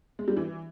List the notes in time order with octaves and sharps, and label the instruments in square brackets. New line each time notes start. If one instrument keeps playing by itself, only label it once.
[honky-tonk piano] G#3
G3
E3